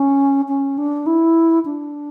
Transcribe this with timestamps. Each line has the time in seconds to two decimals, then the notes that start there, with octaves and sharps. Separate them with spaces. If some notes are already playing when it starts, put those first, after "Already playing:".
Already playing: C#4
0.48 C#4
0.78 D4
1.06 E4
1.65 D4